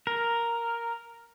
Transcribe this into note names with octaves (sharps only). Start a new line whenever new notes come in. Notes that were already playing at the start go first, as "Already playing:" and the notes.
A#4